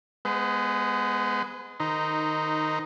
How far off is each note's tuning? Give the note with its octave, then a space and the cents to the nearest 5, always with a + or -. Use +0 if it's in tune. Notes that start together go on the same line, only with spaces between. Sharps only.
G#3 +0 B3 +0 C5 -40
D#3 -15 D#4 +0 C5 -30